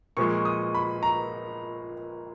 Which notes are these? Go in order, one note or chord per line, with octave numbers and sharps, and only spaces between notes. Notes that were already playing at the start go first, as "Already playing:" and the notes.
A#2 F3 G#3 C#6
D#6
B5
A#5